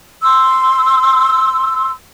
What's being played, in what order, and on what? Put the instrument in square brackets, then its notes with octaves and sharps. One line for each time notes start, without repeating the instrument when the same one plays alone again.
[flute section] C6 E6